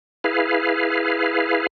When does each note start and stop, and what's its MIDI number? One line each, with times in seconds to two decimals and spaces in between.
0.24 1.67 64
0.24 1.67 68
0.24 1.67 71
0.24 1.67 77